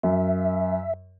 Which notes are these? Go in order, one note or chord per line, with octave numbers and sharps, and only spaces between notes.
F#2 E5